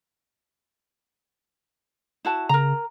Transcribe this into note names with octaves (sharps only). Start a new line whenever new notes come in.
E4 F#4 A5
C#3 A#4 A#5